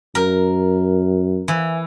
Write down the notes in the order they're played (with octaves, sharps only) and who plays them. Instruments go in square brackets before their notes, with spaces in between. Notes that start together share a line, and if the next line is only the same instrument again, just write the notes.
[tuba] F#2 [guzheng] A#4
[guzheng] E3